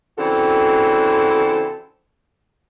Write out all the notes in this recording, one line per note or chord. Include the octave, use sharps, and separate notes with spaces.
C#3 E3 C4 D4 F#4 A4